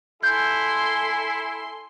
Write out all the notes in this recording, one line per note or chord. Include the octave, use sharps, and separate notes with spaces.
E4 A4 G#5 C6 G6